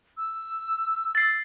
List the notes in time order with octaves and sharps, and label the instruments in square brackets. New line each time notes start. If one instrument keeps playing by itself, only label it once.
[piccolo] E6
[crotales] A6 C7